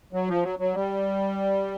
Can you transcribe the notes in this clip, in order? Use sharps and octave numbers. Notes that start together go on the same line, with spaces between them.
F#3
F3
F#3
F#3
G3